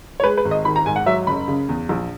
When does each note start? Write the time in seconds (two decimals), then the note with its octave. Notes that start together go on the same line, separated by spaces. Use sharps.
0.20 C#5
0.23 G#3 B4
0.37 B4
0.45 G#1
0.51 D#5
0.65 D#3 B5
0.76 A#5
0.86 G#2 G#5
0.96 F#5
1.06 F#3 E5
1.27 F#1 B5
1.48 C#3
1.69 E2
1.89 A#1